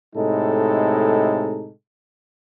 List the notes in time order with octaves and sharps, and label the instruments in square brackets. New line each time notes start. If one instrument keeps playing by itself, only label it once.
[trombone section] A2 C3 G#3 D#4 A4